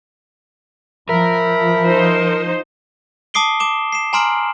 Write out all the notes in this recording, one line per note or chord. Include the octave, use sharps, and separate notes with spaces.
F3 A#4 E5 B5
D#4 C5
A5 D6 D#6 C7 D7 G7
D6 E7 G7
C7 E7
G#5 A#5 C6 F6 D7 F#7